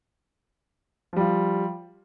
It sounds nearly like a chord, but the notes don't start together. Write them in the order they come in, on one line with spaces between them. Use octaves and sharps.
F3 G3 F4